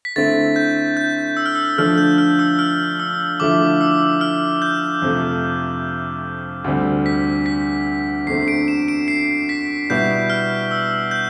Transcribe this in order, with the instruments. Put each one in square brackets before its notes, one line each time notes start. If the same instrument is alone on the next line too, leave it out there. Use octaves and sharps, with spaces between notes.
[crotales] B6
[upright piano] D3 A3 C4 E4 [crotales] A6
[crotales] G6
G6
E6
F6
E6
[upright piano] D3 F3 A3 D4 F4 [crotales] F6
[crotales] G6
F6
E6
F6
E6
[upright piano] D3 F3 A3 E4 [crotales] D6
[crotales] E6
F6
G6
[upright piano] F2 C3 F3 A3
D2 D3 G3 C4
[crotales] B6
B6
[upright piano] E2 D3 A3 C4 [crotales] C7
[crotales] D7
E7
D7
C7
B6
[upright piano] B2 G3 B3 E4 [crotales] G6
[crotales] F6
E6
G6